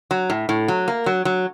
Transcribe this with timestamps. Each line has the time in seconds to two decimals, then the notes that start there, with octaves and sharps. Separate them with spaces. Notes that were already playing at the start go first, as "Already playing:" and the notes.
0.11 F#3
0.30 A2
0.49 A2
0.68 F#3
0.88 A#3
1.06 F#3
1.25 F#3